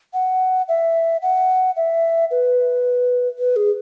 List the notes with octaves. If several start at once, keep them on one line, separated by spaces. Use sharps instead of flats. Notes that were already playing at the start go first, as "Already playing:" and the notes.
F#5
E5
F#5
E5
B4
B4
G#4